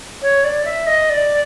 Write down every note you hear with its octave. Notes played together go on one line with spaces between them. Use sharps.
C#5
D5
E5
D#5
D5